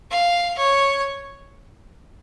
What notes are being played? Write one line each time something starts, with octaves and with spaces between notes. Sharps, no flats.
F5
C#5